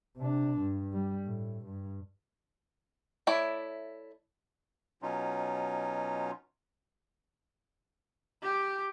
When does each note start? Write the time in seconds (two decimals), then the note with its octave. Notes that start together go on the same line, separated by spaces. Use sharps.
0.17 C3 D4
0.59 G2
0.93 G3
1.25 A2
1.66 G2
3.27 A3 E4 C#5 D5
5.02 B2 F#3 C#4 D#4 F4
8.42 G4